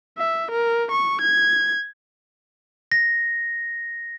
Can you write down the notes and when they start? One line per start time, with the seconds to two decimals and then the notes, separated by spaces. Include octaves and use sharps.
0.18 E5
0.52 A#4
0.91 C#6
1.21 G#6
2.92 A#6